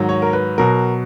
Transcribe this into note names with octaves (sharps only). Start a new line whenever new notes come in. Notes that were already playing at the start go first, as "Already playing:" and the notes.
Already playing: G#2 D#3 F#3
C#5
A#4
B4
B2 F#3 A#4